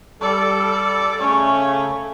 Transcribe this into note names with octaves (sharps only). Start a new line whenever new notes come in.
G3 A4 D5
C#3 A3 C#4 C#5